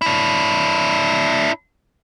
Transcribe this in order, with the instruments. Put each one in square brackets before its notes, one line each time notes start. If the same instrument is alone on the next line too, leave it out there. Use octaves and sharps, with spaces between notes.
[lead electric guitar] D4 E4